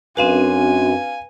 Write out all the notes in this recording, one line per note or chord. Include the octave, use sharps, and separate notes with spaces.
F#2 C4 D4 F#4 B4 F5 G#5 D#7